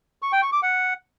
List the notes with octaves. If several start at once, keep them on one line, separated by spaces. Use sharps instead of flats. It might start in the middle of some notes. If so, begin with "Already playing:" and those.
C#6
G5
C#6
D6
F#5